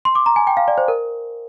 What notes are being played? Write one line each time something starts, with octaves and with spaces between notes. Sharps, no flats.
C6
D6
A#5
G#5
G5
F5
D5
C5
A#4